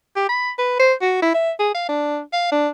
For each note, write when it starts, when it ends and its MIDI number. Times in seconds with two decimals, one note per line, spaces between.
0.16 0.28 67
0.29 0.51 83
0.59 0.76 71
0.79 0.94 72
1.02 1.20 66
1.22 1.34 64
1.34 1.52 76
1.60 1.71 68
1.75 1.86 77
1.89 2.21 62
2.33 2.47 77
2.52 2.69 62